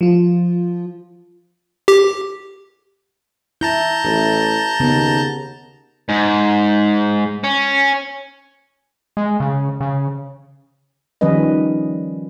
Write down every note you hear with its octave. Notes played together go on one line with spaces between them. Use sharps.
F3 F4
G4
E4 A5 A#5 G6
A1 E4
D#2 C#3 B3
G#2
C#4
G#3
C#3
C#3
D#3 F3 G3 C#4 B4 D#5